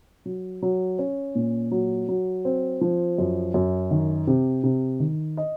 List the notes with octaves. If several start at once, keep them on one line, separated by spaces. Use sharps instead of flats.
F#3
F#3
C#4
A#2
F#3
F#3
C4
F3
F#2
F#2
D#3
C3
C3
D#3
D#5